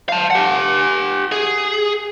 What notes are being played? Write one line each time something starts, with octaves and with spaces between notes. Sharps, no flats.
F5 A5
G4 F#5
G#4